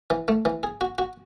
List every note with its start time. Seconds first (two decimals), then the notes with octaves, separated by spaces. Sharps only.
0.10 E3
0.28 A3
0.45 E3
0.63 G#4
0.81 F#4
0.98 F#4